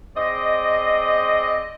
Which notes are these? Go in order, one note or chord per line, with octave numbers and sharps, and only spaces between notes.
G#3 C4 D5 D#5